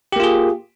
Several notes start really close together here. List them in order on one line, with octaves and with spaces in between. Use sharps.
G4 A#3 F4 G#4